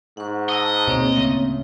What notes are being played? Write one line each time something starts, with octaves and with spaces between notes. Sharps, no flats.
G#2 F#5 C#6
D#5 A5 D#6 E6
D2 B2 A#3 C4 C#5
D1 C#3 A3